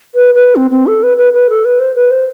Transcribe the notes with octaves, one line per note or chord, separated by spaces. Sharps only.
B4
B4
C4
C4
A4
B4
B4
B4
A4
B4
C5
B4
C5